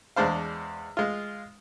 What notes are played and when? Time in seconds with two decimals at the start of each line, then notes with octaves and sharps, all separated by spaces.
0.16 E2 G#3 D4 C5 F5
0.97 G#3 F4